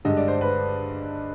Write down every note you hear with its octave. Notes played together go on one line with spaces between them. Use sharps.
G2 D3 G#3 D#5
D5
C5
B4